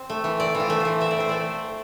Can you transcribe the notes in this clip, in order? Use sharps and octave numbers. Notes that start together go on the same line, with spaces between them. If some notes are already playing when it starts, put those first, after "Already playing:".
Already playing: C4
A3
E3
C4 D5
E3
F4
A3
E3 C5
C4 E5
D5
E3 C5
A3 D5